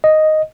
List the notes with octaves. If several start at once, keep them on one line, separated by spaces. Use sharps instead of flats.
D#5